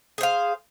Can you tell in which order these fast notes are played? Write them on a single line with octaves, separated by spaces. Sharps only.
G#4 C5 F5